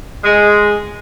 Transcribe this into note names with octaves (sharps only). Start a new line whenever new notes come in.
G#3